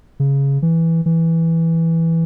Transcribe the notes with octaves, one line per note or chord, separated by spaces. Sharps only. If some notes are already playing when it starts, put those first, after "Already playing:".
C#3
E3
E3